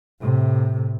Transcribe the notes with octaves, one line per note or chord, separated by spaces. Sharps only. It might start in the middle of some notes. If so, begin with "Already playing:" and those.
A2 C3